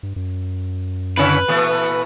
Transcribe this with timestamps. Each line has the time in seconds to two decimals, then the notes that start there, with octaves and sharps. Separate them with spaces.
0.03 G2
0.16 F#2
1.17 C#3 C#4 E4 B4
1.48 A#2 E3 A3